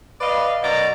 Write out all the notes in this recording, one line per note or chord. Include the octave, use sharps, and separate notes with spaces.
B4 D5 D#5 F5
F#2 B2 D5 A#5